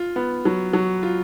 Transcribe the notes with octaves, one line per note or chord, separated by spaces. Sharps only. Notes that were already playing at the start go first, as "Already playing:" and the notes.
Already playing: F4
B3
F#3
F#3
F4